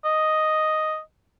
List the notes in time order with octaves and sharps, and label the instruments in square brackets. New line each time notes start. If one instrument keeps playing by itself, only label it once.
[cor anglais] D#5